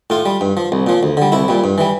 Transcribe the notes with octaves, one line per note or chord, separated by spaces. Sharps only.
A2 F4
G3
G2
F3
C2
A#2 F3
D2
D3 G3
C2 E4
A#2 G3
G2
E3 G3